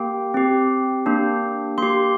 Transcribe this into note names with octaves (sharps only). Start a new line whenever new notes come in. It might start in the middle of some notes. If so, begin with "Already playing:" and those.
Already playing: A#3 G4 G5
C4 G4
A#3 D4 G4
A#3 G4 C6